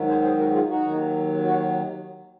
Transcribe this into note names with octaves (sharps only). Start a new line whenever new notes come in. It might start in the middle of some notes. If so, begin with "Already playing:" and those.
Already playing: G#2 D#3 F#3
G#4 C5
G#4 C5
F#4 A#4
F4 G#4
D#4 F#4
D#2 D#3 F#3
F#4